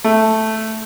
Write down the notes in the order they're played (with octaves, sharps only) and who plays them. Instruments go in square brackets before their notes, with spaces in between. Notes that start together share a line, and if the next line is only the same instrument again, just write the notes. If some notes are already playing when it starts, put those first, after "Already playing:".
[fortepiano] A3